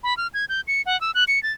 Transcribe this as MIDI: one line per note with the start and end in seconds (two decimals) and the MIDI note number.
0.04 0.16 83
0.17 0.27 89
0.34 0.45 92
0.49 0.61 91
0.68 0.82 97
0.86 0.99 78
1.01 1.11 88
1.15 1.24 90
1.28 1.42 97
1.43 1.52 93